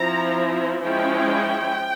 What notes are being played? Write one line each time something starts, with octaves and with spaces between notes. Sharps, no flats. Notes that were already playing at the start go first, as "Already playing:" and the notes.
Already playing: F3 C4 E4 A#5
F3 G#3 C#4 E4 G5